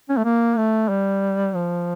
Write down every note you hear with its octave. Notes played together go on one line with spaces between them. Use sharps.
C#4
A3
A#3
A3
G3
F3